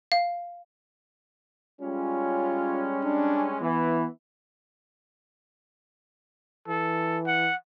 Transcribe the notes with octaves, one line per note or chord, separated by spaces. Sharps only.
F5
G3 G#3 C#4 F4
D4
E3 B3
E3 A4
F#5